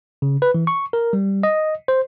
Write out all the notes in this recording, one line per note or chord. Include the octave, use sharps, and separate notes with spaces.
C#3
B4
E3
C#6
A#4
G3
D#5
C5